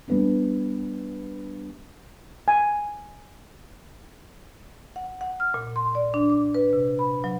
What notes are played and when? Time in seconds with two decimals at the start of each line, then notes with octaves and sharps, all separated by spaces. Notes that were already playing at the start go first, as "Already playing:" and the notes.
0.08 G3 B3 D4
2.48 G#5
4.96 F#5
5.21 F#5
5.40 F6
5.54 A#2
5.76 C6
5.95 D5
6.14 D4
6.30 D6
6.55 B4
6.73 C3
6.99 B5
7.24 F#3